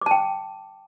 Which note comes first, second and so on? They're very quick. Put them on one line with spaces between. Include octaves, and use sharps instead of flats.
D6 A5 G5